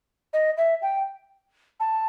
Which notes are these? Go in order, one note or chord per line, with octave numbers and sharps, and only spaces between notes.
D#5
E5
G5
A5